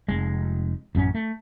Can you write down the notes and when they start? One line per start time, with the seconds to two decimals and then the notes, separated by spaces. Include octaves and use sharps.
0.08 F1 G#3
0.95 A1 F#2 B3 C#4
1.15 A3